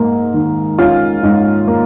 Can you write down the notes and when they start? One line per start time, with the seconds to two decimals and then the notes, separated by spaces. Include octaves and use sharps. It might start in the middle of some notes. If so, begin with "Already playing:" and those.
Already playing: G#2 A#3
0.34 D#3
0.79 C#4 F4
1.23 G#2
1.67 A#3